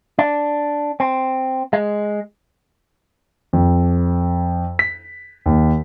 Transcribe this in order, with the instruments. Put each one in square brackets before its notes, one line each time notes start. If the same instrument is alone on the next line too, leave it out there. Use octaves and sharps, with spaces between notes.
[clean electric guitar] D4
C4
G#3
[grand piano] F2
B6
D#2